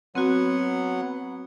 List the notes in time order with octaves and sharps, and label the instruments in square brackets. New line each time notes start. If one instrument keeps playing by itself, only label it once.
[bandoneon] F#3 B3 F#5 [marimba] C4 F#4